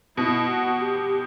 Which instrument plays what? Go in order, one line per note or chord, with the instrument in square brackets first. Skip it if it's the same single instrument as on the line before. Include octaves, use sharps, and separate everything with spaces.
[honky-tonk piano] B2 [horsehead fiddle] E4
[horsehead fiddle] F#4
G4